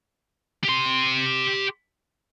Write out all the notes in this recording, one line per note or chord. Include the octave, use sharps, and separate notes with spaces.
G4 C6